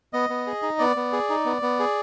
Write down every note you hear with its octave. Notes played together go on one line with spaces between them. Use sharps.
B3 D#5
B3
G#4
D#4
B3 D5
B3
G#4
D#4
B3
B3
G#4